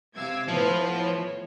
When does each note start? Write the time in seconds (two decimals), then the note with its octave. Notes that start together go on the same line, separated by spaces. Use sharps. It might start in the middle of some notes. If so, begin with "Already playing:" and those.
0.15 C3 F5 D6 E6 G#6
0.48 A2 F3 B3 B4 C5
0.99 C#5